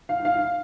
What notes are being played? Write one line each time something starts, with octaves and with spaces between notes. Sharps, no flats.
F5
F5